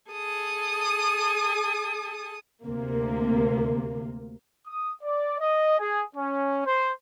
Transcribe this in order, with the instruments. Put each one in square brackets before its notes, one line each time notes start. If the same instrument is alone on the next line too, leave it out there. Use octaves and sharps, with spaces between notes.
[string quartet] G#4 A4 D#6
[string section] D2 C3 A#3
[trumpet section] D#6
D5
D#5
G#4
C#4
C5